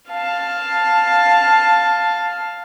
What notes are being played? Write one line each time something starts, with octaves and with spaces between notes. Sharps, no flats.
F5 A5